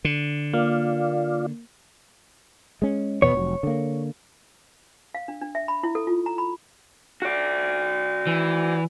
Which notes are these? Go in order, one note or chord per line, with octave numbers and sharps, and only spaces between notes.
D3
A#3 F4 D5 F5
G#3 C#4
E2 B2 B3 C#5
F1 F#3
D3 A#3
F5
D4
D4
E5
B5
E4
A4
F4
A#5
B5
F#4 D5
E3